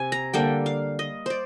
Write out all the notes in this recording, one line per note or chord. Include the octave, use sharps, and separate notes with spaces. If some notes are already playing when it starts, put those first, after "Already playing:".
Already playing: C3 G#5
A#5
D3 G3 A#3 D4 G5
F5
D#5
C5 D5